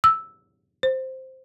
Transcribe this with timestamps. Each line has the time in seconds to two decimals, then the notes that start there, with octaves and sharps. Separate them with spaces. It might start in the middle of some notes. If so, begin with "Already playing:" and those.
0.04 E6
0.83 C5